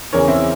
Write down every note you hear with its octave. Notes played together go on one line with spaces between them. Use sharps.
E2 C#3 E3 A#4 C#5
C4 E4